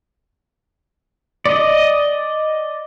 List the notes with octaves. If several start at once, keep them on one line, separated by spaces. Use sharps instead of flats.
D5 D#5